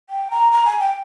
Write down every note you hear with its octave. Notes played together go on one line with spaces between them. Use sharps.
G5
A#5
A#5
G#5
G5